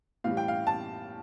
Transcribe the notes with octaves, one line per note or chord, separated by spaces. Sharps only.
A2 E3 G3 F5
G5
F5
A5